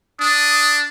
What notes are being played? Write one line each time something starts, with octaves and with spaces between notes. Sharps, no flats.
D4 D#6